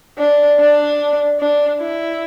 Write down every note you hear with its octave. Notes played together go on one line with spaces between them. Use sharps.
D4
D4
D4
E4